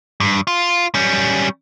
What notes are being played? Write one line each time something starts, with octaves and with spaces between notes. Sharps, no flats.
G2
F4
G3 C#4